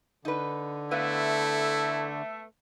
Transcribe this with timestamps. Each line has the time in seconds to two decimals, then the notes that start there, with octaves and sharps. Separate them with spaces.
0.25 D3 D#4 B4
0.91 A3 B3 E4 B4 E5 F5